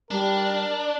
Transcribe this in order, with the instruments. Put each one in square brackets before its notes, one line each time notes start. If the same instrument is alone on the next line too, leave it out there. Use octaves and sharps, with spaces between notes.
[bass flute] G3 [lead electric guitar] D4 [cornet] A#4